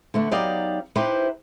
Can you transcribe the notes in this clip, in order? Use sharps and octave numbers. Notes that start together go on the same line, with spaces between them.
D3 A3 B3
F#3 B3 D#4 G4 D5 F5
D#4 E4 G4 B4 C5